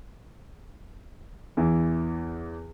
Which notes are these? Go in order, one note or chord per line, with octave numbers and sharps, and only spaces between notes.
E2 E3